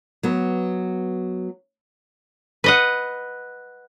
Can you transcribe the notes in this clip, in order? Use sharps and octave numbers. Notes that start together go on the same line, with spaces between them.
F#3 B3
B4 D#5 F#5